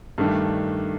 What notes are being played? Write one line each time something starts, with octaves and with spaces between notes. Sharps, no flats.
G2 D#3 A3 D4